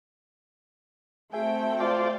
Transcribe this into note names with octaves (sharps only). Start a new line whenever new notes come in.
A3 C4 F#4 G#4 E5 G5 G#5
F4 C5 D5